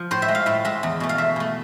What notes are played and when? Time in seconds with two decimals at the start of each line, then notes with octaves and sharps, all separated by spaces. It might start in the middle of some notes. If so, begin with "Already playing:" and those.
Already playing: F3
0.11 A2 C5
0.22 E5
0.28 G#3
0.35 F5
0.46 A2 E5
0.65 G#3 E5
0.83 E2
1.00 B2 A3
1.09 F5
1.18 E2 E5
1.36 B2 A3